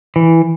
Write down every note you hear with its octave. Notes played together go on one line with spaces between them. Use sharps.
E3